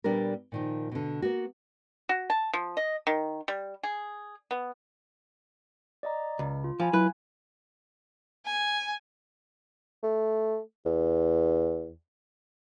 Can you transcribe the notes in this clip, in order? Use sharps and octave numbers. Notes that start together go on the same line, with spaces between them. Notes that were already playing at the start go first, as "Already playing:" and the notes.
A#2 G3 B3 D4 A#4
A#2 D#3 F3
B2 D3
A#3 B3 F#4
F#4
A5
F3
D#5
D#3
G3
G#4
B3
D5 D#5 A#5
C#2
F4
F3 F5 G#5 B5
F#3 E4 B4 F#6
G#5
A3
E2